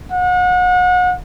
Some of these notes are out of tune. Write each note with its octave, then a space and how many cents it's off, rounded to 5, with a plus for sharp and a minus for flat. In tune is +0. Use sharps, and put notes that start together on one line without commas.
F#5 -35